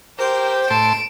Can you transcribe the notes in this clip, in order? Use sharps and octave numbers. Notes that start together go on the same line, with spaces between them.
G4 A#4 C5
A2 A5 C6 D7 E7